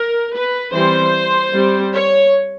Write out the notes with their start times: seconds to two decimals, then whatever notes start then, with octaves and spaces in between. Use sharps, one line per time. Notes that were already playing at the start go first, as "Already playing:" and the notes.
Already playing: A#4
0.34 B4
0.74 E3 G3 C4 C5
1.54 G3 C4
1.95 C#5